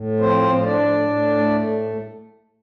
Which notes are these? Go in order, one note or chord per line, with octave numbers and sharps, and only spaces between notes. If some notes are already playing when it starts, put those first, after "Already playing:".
Already playing: A2
F3 C4 C5
A2
C5
D4 D5
A2
A2
A3
A2